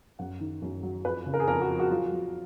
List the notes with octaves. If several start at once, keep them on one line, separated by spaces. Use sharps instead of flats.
F#2 F#5
D#3
F#2
F#3
F2 B4
C#3
A#4
G#4
F2 A#4
F#4
F3
F#4
F#3 F4
F#3